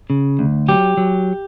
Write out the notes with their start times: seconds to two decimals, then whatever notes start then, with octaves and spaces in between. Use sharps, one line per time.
0.10 C#3
0.39 D2
0.68 F#3 G4
0.97 F#3